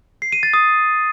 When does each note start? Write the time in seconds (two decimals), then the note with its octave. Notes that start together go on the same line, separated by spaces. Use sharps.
0.22 C7
0.32 D#7
0.43 A6
0.54 D#6